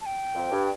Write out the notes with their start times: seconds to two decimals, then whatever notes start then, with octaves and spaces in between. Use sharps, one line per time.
0.01 A5
0.06 G5
0.34 F2
0.51 G2